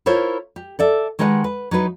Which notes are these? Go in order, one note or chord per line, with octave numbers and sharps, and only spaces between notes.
E4 F4 A#4 C5 C#5
G4
A4 D5 E5
D#3 G#3 G4 B4 F5 F#5
B4
F#3 D#4 E4 B4